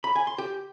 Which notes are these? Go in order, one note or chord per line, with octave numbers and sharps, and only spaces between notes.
B5
G#5
C6
G4